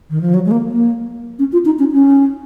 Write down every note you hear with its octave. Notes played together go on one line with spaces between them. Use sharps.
D#3
F3
F#3
G#3
A#3
A#3
C#4
F4
D#4
C#4
C#4